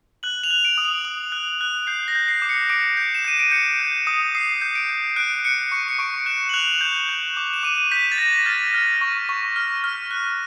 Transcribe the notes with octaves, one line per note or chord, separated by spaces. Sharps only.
F#6 F#7
F7
F#6
D7
D#6
D7
D#6
F#6
F#6
G6 C7
A#6
G6
C7
D6
C#7
D6 D7
G6
E7
G6 D#7
D7
G6 C#7
G6
D#6
D#6 C7
G6
D7
G6
F#6 D7
F#6 C#7
C#6 C#7
C#7
C#6 D7
F#6 E7
F#7
F#6 F7
G6 E7
G6
D6
E7
D6 D#7
G6 B6
A6
G6 A#6
F6 A6
F6
C#6
C#6
F6
F6
F#6